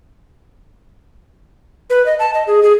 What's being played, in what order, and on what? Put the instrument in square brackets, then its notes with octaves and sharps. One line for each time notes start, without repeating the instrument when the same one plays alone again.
[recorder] B4
D#5
A5
D#5
G#4
G#4